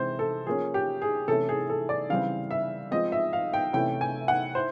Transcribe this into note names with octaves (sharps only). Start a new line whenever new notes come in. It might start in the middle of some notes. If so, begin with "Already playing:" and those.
Already playing: C3 E3 G#3 C4 C5
A4
F3 A#3 C#4 G#4
G4
G#4
C3 E3 A3 C#4 E4 A4
G#4
A4
D5
C#3 E3 G3 C4 F5
E5
F3 G#3 C4 D#5
E5
F5
G5
C3 E3 A3 C#4 E4 G5
G#5
F#5
E4 C5